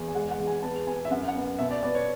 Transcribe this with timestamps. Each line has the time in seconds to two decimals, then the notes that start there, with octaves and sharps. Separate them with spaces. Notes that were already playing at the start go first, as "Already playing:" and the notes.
Already playing: E2
0.08 G#5
0.15 G#3 F#5
0.31 F#5
0.40 E2
0.47 G#5
0.63 B3 A5
0.87 B3 G#5
1.05 E5
1.11 F#2 F#5
1.28 F#5
1.35 B3
1.59 B2 E5
1.71 D5
1.83 B3 D5
1.95 C#5